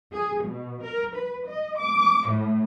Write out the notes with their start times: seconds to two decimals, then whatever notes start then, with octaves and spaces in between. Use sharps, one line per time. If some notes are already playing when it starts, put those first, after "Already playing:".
0.12 G#4
0.43 B2
0.82 A#4
1.15 B4
1.47 D#5
1.78 D6
2.27 A2